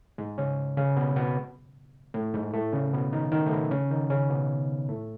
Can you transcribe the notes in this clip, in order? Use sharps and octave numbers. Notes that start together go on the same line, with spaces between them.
G#2 G#3
C#3 C#4
C#3 C#4
B2 B3
B2 B3
A2 A3
G#2 G#3
A2 A3
C#3 C#4
B2 B3
D#3 D#4
D#3 D#4
A3
B2 B3
C#3 C#4
D#3 D#4
C#3 C#4
B2 B3
A2 A3